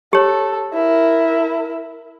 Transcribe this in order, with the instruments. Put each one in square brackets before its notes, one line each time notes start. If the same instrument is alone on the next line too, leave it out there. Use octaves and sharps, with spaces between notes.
[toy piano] G4 C#5 [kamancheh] A4
[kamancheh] E4 A#4